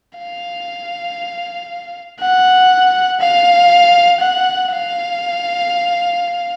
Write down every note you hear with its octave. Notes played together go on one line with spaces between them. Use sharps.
F5
F#5
F5
F#5
F5